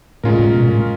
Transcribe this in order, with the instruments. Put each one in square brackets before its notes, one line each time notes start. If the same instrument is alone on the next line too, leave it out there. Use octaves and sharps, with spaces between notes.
[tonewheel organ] A2 [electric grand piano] G#3 C#4 F4 A#4
[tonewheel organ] A2
B2
A2